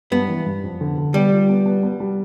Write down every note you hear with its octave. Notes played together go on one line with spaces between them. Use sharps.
G2 B3
E3
G2
F2
D3
D3
G3 B3
F4
B3
B3
B3
G3